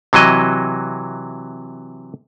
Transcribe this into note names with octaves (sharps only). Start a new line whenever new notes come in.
C3 E3 F#3 D#5